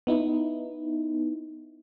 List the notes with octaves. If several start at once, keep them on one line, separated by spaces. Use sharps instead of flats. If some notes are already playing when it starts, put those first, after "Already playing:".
B3 D#4 E4